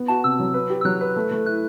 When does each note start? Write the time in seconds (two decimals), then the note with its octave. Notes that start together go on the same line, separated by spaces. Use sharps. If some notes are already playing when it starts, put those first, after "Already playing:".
Already playing: B3
0.08 F#4 A5
0.24 C3 E6
0.39 F#3
0.54 B4
0.70 G4
0.81 E6
0.85 F#3 F#6
1.01 B4
1.16 A3
1.31 A3
1.46 E4 F#6